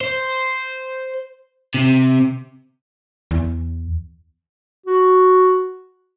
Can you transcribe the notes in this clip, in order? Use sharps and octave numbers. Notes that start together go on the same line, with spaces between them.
C5
C3
E2
F#4